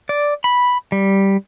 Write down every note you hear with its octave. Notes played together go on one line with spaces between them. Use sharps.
D5
B5
G3